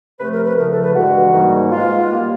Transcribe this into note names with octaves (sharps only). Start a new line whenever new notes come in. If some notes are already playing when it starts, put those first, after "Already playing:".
C3 F3 A3 B4
A#4
B4
E2 C#3 F3 A3 A#4
A4
B4
G2 E3 G#3 F#4
G#2 D#3 G3 A#3
B2 G#3 F4
A#2 G3 A#3